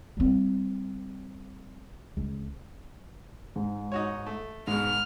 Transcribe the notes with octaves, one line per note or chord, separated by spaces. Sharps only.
G3 C4
C#2
G#2
D#4 F#4 C#5
A3
G#2 B2 G#3 F6